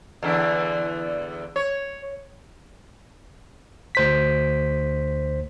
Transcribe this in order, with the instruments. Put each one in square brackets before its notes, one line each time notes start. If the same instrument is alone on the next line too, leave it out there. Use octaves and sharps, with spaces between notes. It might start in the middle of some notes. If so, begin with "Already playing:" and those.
[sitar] E2 D3 E4
C#5
[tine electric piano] D2 C5 B6